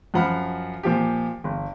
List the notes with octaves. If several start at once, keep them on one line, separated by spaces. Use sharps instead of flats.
F#2 F3 F#5 B5 F6
A#2 F3 G4
G1